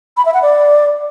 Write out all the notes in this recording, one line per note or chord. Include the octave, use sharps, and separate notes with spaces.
B5
E5
F#5
D5